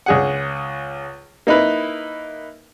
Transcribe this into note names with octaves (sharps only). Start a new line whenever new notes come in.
C#2 G#4 F#5
A#3 D#4 E4 B4